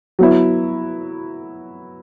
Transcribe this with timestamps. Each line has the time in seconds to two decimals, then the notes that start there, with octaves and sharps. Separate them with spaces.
0.19 F#3 B3 E4